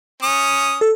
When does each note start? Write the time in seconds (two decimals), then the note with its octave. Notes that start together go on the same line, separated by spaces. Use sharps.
0.23 C#4 D#6
0.81 A4